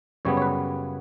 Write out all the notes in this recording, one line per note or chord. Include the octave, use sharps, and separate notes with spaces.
F#2 C#3 G3 B3 C#5
C#5
B4